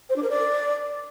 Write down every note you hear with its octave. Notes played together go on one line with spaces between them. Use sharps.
C5
D4
A#4
D5